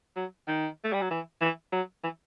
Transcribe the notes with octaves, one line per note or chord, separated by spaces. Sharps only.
F#3
D#3
A3
G3
F#3
E3
E3
F#3
E3